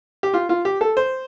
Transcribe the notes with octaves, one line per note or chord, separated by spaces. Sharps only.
G4
F4
F4
G4
A4
C5